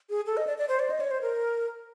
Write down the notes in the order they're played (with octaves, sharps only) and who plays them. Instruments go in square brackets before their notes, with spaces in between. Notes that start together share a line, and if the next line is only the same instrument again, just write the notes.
[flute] G#4
A4
D#5
D5
D5
C5
D5
D#5
C#5
C5
A#4